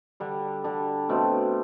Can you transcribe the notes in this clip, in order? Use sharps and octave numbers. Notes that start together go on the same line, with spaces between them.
D3 G3 D4
D3 G3 D4
B2 A3 C4